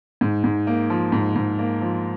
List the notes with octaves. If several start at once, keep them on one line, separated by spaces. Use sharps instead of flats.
G#2
G#2
A#3
F3
G#2
G#2
A#3
F3